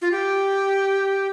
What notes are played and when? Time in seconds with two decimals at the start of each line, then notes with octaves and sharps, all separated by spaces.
0.02 F4
0.12 G4